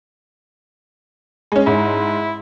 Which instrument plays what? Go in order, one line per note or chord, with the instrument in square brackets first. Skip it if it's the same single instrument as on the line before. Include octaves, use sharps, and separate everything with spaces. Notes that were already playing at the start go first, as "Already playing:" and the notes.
[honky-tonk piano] G#3 C#4
[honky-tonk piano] G#2 [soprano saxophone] E4